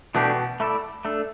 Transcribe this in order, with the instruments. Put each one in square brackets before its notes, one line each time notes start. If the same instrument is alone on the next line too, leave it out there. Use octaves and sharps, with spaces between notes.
[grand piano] B2 [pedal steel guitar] E3 A3 D4 G4
[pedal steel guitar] A3 E4 A4 D5
A3 D4 A4